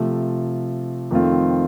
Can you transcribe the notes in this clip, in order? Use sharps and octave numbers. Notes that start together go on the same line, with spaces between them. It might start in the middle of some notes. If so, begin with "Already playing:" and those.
Already playing: C3 F3 A3
F2 D#3 A3 C4 F4